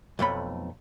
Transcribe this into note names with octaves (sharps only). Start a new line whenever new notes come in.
B1 F2 A3 B5